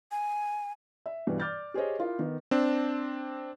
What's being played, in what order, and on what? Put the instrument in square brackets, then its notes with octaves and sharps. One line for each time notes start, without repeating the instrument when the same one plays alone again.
[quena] G#5
[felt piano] E5
G2 B2 E3 G3
D5 D6 F6 G6 A6
G4 G#4 C5 C#5 D#5
E4 F4 A#4
D#3 B3
[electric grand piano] C4 D4